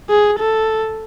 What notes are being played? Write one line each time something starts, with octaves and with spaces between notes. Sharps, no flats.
G#4
A4